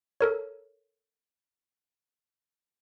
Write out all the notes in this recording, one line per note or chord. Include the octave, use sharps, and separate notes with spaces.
A4 A#4 C#5